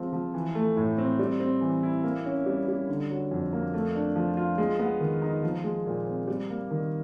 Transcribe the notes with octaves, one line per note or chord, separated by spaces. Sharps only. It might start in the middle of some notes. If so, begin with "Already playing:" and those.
Already playing: F3 G#3 C4
F3
E3
A3
A2
C4
G3
C4
E3
E4
A#3
C#4
G3
G3
D3
F#3
F2
A#3
A3
D4
F3
F4
G#3
B3
D#3
D#4
F3
G#3
A#2
C4
G3
A#3
D#3